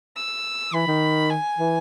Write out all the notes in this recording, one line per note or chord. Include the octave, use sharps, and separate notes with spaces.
E6
E3 B5
D#3
G#5
E3